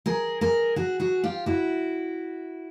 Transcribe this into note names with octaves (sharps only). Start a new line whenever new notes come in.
G#4 A#4
G#4 A#4
F#4 G#4
F#4 G#4
F4 G4
E4 F#4